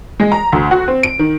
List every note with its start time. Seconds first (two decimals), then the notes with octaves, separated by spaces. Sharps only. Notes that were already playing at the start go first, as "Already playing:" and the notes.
0.20 G#3
0.32 A#5
0.52 D2
0.71 F#4
0.88 C4
1.03 D7
1.19 D#3